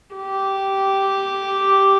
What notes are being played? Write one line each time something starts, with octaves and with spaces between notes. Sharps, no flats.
G4